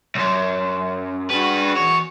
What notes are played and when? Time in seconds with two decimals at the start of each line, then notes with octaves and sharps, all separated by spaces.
0.15 B1 F#2
1.30 D4 F#4 G#4 B4
1.76 E2 C#5